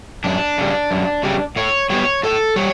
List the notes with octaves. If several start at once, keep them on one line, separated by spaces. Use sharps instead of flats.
F#2 D4
C#3 G3
F#2
C#3 G3
A2 C#5
G3 B3 C#5
A2 A4
G3 C#5